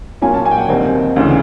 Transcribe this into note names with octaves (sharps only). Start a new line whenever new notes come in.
A#2 F#3 A#3 C#4 G#5
A5
G#5
G5
F#5
D#2 D#3 G3 C4 D#4
D2 C#3 E3